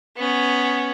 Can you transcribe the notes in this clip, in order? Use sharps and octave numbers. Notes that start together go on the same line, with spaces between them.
B3 C#4